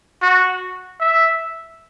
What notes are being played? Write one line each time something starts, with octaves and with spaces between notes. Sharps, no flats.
F#4
E5